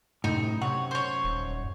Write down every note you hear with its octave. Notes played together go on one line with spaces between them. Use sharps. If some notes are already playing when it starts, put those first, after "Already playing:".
F#2 A2 C3 D#4
C3 C#5 F#5
C5 C#5
D#1